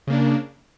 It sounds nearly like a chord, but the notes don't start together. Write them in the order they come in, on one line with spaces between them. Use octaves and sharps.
C#3 A#3 D4